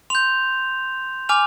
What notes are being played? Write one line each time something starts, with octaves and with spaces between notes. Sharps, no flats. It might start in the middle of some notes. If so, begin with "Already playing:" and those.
C6 G6 F7
G#5 D6 F6 F7